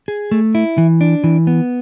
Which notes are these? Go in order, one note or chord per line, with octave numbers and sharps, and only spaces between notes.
G#4
A3
E4
E3
D4
E3
B3